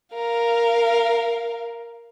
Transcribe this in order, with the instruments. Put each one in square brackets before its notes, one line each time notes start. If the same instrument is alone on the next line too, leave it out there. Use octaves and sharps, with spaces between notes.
[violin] A#4 F5